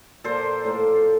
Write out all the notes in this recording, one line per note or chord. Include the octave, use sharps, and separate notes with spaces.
A#2 F3 A#3 A4 C5
A2 F3 A#3